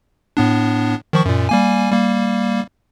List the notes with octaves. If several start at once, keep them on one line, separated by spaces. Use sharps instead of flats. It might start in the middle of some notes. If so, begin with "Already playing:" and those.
A2 B3 D4
D#3 F3 C#6
F#2 A#2
G3 A#3 G#5
G3 A#3